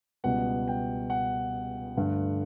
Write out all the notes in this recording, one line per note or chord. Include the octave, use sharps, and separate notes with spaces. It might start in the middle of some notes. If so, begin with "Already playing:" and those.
C#2 B2 G3 B3 F#5
G5
F#5
G2 D3 A3